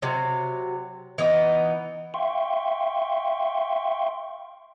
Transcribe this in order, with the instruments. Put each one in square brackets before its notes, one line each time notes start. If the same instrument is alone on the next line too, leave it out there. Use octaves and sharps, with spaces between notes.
[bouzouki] C3 F#3
E3 B3 D#4
[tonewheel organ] E5 F5 G5 C6 C#6